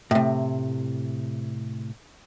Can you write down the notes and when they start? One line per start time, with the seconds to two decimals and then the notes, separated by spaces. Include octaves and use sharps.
0.11 A2 C3